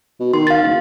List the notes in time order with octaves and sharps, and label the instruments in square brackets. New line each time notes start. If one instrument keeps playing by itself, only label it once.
[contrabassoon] B2
[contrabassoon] D#3 [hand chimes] C6
[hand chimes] F5 A6
[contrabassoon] F#1